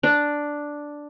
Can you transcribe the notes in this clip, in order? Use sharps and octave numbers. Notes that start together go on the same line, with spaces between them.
D4